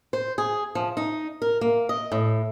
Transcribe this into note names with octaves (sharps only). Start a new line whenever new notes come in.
C5
G#4
F3
D#4
A#4
A#3
D#5
A2